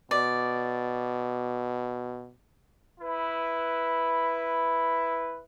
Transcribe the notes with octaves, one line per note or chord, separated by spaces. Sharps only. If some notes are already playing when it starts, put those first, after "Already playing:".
B2 D5
E4 B4